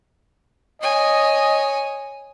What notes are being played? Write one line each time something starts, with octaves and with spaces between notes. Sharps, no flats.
C#5 D#5 G#5